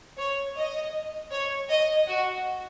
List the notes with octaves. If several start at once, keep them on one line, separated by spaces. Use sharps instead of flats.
C#5
D#5
C#5
D#5
F#4